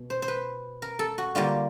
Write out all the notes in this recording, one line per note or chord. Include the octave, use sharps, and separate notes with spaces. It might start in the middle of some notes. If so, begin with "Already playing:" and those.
Already playing: B2
C5
C5
B4
A#4
A4
F#4
D3 G3 A#3 F4